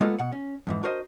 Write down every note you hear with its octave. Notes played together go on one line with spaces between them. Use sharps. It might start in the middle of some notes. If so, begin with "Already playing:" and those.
G#3 A#3 B3 F4 A4
B2 F#5
C#4
F2 G#2 E3
D4 F#4 A#4 C5 D#5